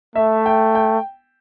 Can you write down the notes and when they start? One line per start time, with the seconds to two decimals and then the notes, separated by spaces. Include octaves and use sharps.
0.16 A3 E5
0.46 G5
0.75 G5